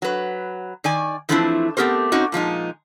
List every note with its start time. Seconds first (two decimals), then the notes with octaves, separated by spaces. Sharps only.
0.02 F#3 B4
0.84 D#3 D5 G#5
1.29 E3 F3 A3 C4 D4 E4
1.77 A3 B3 C4 G4 A#4 C5
2.12 C4 C#4 D#4 F#4
2.32 A#2 F3 G#3 D#4